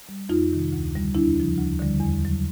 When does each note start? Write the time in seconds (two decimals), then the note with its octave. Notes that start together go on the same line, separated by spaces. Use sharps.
0.09 G3
0.29 F2 D#4 F4
0.52 C3 D#3
0.72 D2
0.93 D3 G3
1.15 E2 D4 E4
1.36 C#3 F3
1.58 D2
1.79 D3 G3
2.00 E2
2.22 C#3 F#3